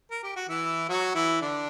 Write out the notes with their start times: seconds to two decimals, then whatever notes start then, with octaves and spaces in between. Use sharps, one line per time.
0.11 A#4
0.24 G4
0.36 F#4
0.49 E3 E4
0.89 F#3 F#4
1.15 E3 E4
1.42 D3 D4